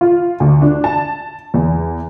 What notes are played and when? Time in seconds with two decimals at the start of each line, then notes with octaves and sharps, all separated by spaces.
0.01 F4
0.40 D2
0.62 D4
0.84 A5
1.54 E2